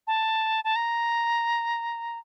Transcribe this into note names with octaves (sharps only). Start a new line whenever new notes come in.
A5
A5
A#5